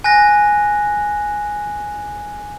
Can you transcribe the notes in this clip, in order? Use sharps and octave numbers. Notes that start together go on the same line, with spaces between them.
G#5 F#6 A#6